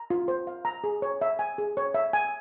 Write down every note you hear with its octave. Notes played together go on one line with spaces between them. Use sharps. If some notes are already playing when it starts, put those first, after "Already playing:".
Already playing: A#5
F4
C5
F5
A#5
G#4
C#5
E5
G#5
G#4
C#5
E5
G#5